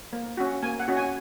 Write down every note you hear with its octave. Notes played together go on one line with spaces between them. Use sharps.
A#3
C#4 F#4
A#3 G#5
F#5
C#4 F#4
G#5